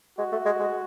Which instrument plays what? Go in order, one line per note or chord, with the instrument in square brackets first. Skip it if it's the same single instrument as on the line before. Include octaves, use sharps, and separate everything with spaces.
[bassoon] G#3 [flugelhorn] F#4
[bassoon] A3
G#3
G#3